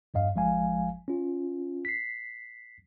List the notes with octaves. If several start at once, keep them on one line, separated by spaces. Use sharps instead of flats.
E2 G2 D#5 F5
G#1 F3 G#3 F5 G#5
C#4 F4
B6 C7